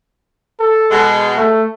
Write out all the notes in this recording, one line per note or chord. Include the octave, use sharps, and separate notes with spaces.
A4
B2 G#3
A3